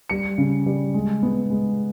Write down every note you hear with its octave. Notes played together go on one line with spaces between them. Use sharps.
G3 C#7
C#3
G3
G#3
B3
G#3